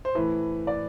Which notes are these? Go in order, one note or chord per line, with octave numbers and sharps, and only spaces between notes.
C5
A2 E3 B4
D5